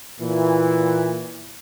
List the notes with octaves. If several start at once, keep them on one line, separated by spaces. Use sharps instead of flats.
A#2 E3